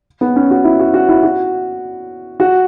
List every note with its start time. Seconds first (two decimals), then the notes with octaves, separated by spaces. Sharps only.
0.21 B3
0.36 C#4
0.50 F#4
0.64 E4
0.79 F#4
0.94 F#4
1.09 E4
1.23 F#4
2.40 F#4